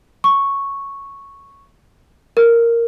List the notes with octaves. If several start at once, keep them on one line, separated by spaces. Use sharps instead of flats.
C#6
A#4